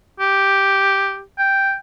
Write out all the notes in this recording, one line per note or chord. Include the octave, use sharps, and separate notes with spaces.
G4
G5